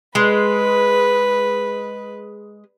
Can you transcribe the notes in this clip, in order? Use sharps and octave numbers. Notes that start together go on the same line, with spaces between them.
G#3 B4